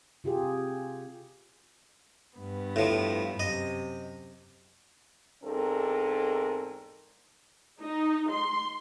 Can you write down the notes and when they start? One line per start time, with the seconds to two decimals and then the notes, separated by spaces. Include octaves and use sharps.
0.24 C3 F4 G4 G#4
2.37 G2 B3
2.76 A2 F3
3.40 F#2 C3 D#5
5.43 E2 G#2 C4 A4 A#4
7.79 D#4
8.31 C6